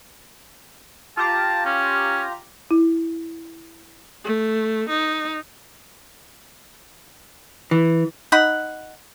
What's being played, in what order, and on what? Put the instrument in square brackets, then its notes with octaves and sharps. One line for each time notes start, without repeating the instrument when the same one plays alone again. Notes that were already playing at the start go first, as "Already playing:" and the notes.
[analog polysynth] F4 G4 A#5 [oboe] A5
[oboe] C#4
[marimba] E4
[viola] A3
D#4
[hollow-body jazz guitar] E3
[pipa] D#4 F#5 B5